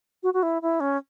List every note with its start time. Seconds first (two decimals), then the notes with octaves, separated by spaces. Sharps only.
0.23 F#4
0.34 F#4
0.43 E4
0.62 E4
0.80 C#4